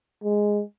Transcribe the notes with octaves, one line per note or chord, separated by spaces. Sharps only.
G#3